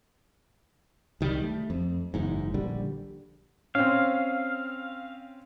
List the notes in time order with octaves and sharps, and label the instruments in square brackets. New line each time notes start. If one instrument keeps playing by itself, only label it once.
[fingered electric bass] C2 D#3 F3 G3
A3
F2
F#1 E2 G#2
A#1 D3 G3
[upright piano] C4 C#4 [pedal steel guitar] F5